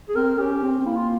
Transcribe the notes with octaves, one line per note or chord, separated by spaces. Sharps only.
G#4
C4 A#4
C#4 G4
C4
C4
A#3 E4
F4